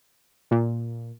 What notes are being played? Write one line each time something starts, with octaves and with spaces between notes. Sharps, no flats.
A#2